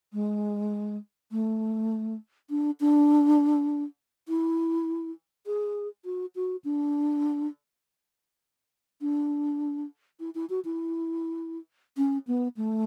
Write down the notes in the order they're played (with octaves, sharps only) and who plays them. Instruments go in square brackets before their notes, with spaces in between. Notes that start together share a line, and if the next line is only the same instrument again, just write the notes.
[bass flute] G#3
A3
D4
D4
E4
G#4
F#4
F#4
D4
D4
E4
E4
F#4
E4
C#4
B3
A3